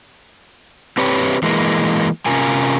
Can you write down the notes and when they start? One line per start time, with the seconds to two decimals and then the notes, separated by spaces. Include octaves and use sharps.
0.98 C4 G4 B4 C#5
1.43 E3 G#3 A#3
2.26 C3 C#4 F4 A#4 G#5